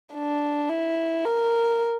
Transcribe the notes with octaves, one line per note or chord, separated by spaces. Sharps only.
D4
E4
A#4